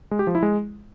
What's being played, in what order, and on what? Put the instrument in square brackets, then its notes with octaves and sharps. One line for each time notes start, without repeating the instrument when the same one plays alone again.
[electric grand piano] G#3
G4
F3
E4
G#3